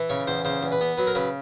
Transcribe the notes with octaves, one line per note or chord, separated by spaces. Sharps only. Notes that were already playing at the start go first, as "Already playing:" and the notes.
Already playing: E3
C#3 C#5
E2 C5
C#3 C5
E2
B4
B3
F#3 B4
A#4
C#3 B4